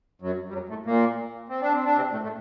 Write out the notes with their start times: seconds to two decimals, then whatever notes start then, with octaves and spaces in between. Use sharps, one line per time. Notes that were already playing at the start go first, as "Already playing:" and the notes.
0.21 F#2 F#3
0.49 G3
0.53 F#2 F#3
0.69 A2 A3
0.86 A#2 A#3
1.49 C4
1.61 D4
1.73 C4
1.85 D4
1.96 C3 C4
2.12 A2 A3
2.23 A2 A3